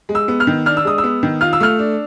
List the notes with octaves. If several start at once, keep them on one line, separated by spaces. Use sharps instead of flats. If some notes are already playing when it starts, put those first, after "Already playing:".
G#3
E6
B3
F6
D#3
D4 F6
E6
G#3 D#6
E6
B3
D#3
F4 F6
E6
A3 F6
D4